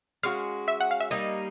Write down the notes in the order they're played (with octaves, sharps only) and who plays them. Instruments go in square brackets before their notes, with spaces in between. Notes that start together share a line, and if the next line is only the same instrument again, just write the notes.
[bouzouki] G#3 C#4 F#4 [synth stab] F5
[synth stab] E5
F#5
F5
E5
[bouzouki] G3 A#3 D#4 [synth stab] D#5